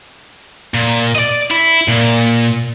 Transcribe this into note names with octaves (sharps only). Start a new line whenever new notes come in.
A#2
D5 D#5
E4
A#2